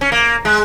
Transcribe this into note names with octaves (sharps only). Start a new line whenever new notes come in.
C#4
A#3
G#3